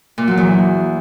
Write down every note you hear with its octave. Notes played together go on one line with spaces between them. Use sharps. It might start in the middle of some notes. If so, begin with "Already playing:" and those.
A#2
F#3
E2